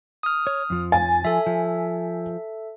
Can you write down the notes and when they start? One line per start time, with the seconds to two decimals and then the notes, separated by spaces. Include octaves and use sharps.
0.23 D#6 F6
0.47 C#5
0.70 F2 F3
0.92 G#5 A6
1.24 F3 A4 E5
1.46 F3